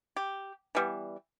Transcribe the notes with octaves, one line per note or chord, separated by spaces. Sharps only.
G4
E3 G3 B3